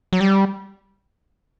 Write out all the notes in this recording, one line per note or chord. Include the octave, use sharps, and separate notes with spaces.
F#3
G3